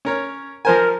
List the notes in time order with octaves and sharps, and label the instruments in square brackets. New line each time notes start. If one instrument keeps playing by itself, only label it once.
[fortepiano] C#4 A#4 C#5
[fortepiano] F3 C5 G#5 [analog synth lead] A#4